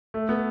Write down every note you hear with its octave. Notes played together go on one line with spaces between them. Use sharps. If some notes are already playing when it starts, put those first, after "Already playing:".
A3
B3